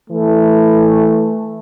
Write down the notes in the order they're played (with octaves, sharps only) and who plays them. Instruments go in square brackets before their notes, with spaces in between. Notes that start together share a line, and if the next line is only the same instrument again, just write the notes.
[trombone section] E3 A3